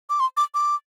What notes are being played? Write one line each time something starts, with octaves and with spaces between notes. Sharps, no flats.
D6
C6
D6
D6